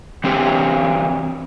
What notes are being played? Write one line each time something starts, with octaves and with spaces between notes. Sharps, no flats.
E3 C4 C#4 G4